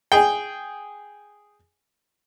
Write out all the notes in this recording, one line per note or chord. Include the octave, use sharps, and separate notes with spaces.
G#4 G5